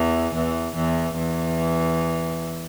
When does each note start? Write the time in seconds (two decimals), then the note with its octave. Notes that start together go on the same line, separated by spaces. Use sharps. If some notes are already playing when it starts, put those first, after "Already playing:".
Already playing: E2 E3
0.34 E2 E3
0.76 E2 E3
1.18 E2 E3